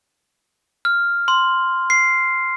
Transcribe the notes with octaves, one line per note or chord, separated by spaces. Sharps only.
F6
C6
C7